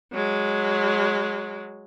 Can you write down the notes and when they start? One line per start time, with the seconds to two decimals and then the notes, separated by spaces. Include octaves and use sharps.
0.12 F#3 G#3